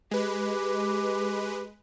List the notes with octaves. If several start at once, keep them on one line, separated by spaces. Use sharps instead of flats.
G#3 G4 B4